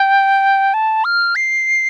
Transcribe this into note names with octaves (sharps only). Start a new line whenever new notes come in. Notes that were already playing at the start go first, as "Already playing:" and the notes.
Already playing: G5
A5
F6
C7